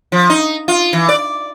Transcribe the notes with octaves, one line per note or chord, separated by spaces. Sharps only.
F3
D#4
F4
E3
D5